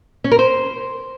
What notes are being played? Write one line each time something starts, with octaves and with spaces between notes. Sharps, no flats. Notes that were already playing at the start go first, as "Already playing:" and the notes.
C#4
A#4
C5